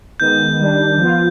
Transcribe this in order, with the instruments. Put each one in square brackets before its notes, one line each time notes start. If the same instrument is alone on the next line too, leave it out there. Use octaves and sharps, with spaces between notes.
[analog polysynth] D#3 G#3 B3 [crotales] G6
[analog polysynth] D#3 G3 D4
F3 B3 F4